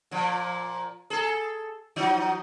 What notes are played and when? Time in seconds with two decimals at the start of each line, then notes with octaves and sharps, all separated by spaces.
0.11 A#2 F3
1.10 G#4 A4
1.96 E3 F#3 D#4